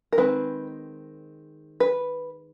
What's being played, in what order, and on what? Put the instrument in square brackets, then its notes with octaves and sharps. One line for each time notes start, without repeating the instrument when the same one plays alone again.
[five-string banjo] A#4
D#3 G#3 C4 B4
B4